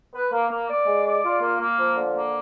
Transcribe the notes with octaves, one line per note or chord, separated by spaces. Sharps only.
B4
A#3
A#3
D5
G#3
D5
F4
A#3
A#3
F3
D3
A#3